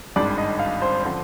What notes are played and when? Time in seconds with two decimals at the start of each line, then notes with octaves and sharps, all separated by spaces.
0.16 G#1 G2 D#3 G#3 D4 D5
0.38 D#5
0.59 F5
0.82 C5
1.04 D3 F3 C4 C5